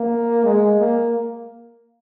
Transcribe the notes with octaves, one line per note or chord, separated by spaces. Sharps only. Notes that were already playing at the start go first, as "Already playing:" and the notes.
Already playing: A#3
G#3
A#3